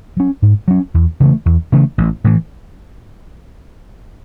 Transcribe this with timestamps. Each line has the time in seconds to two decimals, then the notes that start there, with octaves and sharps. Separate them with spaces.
0.17 F#3 C#4
0.42 G#2
0.68 F#3 C#4
0.94 E2
1.20 C#3 E3 A3
1.46 E2
1.72 C#3 E3 A3
1.98 A1
2.24 A2 E3